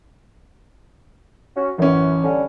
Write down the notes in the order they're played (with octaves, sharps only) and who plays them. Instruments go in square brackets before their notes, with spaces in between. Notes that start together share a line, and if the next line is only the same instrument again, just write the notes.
[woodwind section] C#4 F#4
[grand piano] A1 C#4 [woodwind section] F#2
[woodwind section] D3 G3 C#4